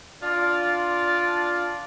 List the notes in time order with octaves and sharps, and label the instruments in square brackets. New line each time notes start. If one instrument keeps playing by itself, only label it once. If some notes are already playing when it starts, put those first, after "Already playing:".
[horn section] D4 F4 D5